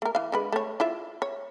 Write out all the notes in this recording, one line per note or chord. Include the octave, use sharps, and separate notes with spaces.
A3 A#4
E3 F5
D3 G#3 B4
A3 C#5
E4 F4 E5
C#5